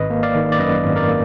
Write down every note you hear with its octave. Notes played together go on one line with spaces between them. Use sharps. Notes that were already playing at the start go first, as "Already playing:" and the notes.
Already playing: G#1 B4 D#5
A#3
D5 F5
D#3
D5
F#2 B4 D#5
G#1
A#4 D5
A#3